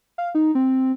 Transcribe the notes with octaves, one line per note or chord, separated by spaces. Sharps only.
F5
D#4
C4